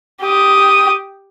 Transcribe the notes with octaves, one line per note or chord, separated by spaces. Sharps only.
G4 D#6